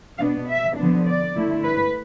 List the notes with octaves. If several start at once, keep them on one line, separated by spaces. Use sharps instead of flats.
B2 B3 D4 F5
E5
D3 F3 B3 D4
D5
D3 A3 E4
B4